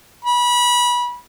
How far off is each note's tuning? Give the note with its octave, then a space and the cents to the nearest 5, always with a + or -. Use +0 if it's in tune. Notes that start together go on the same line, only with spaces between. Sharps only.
B5 -25